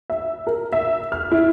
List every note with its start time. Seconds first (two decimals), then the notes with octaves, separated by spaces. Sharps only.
0.10 E5
0.47 A#4
0.73 E5
1.12 F6
1.31 E4